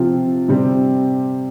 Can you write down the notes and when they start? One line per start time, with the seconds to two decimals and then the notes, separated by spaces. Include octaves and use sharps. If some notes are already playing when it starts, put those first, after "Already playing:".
Already playing: C3 F3 C4 F4
0.48 C3 G3 C4